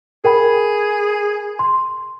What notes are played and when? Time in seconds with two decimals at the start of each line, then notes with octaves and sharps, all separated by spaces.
0.24 G#4 A#4 G5 B5
1.59 C6